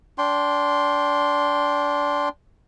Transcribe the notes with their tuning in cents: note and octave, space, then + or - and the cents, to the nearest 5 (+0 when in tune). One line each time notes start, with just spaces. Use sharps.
D4 -20 G5 +0 C6 +0